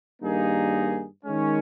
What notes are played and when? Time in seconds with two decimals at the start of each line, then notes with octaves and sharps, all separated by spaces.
0.21 G2 D#3 A#3 D#4 G#4
1.25 D#3 G#3 C#4